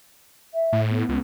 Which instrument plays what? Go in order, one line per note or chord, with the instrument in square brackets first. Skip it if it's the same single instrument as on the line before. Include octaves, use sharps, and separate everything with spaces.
[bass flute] E5
[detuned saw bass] A2
[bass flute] B3
[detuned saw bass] C#2